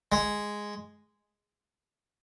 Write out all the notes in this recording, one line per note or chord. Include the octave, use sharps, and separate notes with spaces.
G#3